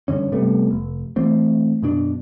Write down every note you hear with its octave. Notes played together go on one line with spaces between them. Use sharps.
G2 D3 C#4
C3 G3 A3 B3
F1
E3 A3 C4
F#2 B2 D4